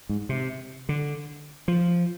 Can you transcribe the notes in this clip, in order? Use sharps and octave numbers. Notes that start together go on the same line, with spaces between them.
G#2
C3
D3
F3